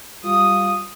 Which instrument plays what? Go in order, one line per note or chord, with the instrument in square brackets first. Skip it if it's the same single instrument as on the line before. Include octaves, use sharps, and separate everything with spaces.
[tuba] G3 [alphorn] F4 [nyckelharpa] D#6